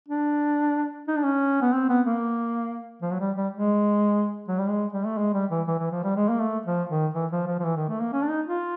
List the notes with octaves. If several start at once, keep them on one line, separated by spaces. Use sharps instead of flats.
D4
D#4
D4
C#4
B3
C4
B3
A#3
F3
F#3
G3
G3
G#3
F#3
G3
G#3
G3
A3
G#3
G3
E3
E3
E3
F3
G3
G#3
A#3
A3
F3
D#3
E3
F3
F3
F3
E3
D#3
A3
A#3
C#4
D4
D#4
F4